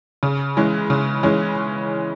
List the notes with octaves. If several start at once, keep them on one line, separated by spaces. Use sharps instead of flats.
C#3
E3 G#3 C#4
C#3
E3 G#3 C#4